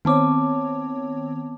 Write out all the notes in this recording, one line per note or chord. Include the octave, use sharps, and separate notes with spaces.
D#3 B3 C4 C#5 A5 D6